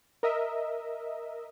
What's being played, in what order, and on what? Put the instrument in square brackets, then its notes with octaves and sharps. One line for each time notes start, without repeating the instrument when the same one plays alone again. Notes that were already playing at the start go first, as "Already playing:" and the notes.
[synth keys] A#4 D#5 E5